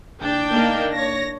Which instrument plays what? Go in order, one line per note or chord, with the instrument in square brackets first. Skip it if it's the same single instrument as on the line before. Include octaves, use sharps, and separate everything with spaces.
[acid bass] F#1 [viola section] D4 G5
[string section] A#3 D#4
[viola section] C#5 [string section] A#6